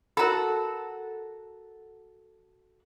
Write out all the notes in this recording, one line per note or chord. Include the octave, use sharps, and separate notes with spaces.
F#4 A4 A#4 A#5 B5